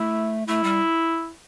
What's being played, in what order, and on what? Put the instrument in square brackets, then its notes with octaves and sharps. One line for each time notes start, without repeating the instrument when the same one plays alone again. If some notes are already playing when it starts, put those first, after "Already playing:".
Already playing: [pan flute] A3 [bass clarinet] E4
[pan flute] A3 [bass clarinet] E4
[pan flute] G3